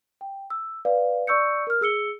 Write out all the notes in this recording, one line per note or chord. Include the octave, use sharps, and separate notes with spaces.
G5
E6
B4 D5 F5
D5 C#6 E6 G6 C#7
A#4 F6
G#4 E6 C#7 G7